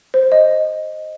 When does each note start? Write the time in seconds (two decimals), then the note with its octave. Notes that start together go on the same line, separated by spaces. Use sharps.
0.14 C5
0.32 D#5